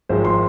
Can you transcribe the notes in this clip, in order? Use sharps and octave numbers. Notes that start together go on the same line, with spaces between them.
G#1 G#2 F3 G#3 C5
C6